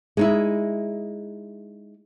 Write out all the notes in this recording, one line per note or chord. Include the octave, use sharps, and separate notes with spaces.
G#3 D#4 E4